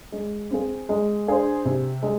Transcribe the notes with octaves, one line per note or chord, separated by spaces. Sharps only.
G#3
C4 G#4
G#3
D4 G#4 C5
C3
G#3